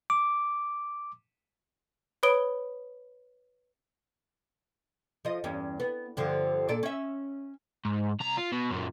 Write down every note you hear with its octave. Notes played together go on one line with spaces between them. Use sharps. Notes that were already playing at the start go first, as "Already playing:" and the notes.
D6
B4 C#5 B5 D#6 D7 G7
F3 D#5
E2 G2 C#4
B3
G2 D3 F3
A#2 A4 D5
C#4 E5
G#2
C2 A#5
F4
B2
F#2 A#2